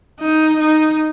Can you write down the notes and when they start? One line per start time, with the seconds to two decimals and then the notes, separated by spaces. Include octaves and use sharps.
0.20 D#4
0.60 D#4